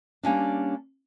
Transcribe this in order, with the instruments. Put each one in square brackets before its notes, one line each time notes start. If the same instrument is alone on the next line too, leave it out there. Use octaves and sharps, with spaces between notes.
[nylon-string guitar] G3 A#3 C#4 D4